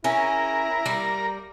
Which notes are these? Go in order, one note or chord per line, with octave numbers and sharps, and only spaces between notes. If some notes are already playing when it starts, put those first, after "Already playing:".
C#4 E4 G#4 A#4
G3 A#3